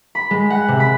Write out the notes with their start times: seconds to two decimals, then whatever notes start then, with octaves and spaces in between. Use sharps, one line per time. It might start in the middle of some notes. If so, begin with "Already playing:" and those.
0.15 B5
0.31 G#3
0.50 F#5
0.68 C3
0.80 B5